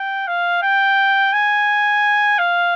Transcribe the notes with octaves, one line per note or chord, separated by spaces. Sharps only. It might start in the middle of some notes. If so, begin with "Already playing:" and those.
Already playing: G5
F5
G5
G#5
F5